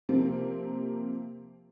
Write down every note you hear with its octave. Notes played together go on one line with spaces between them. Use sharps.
C3 F3 A#3 C4